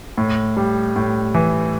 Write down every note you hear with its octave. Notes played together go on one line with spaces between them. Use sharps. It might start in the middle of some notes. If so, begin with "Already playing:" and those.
A2
G3
A2
E3